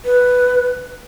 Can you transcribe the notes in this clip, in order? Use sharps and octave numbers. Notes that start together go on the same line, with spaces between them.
B4